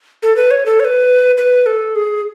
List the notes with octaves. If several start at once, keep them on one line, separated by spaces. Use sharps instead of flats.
A4
B4
C#5
A4
C#5
B4
B4
A4
G#4